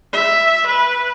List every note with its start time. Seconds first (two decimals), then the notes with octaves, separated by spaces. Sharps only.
0.13 E5
0.67 B4